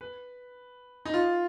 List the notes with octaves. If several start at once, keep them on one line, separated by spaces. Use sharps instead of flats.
B4
D#4
F4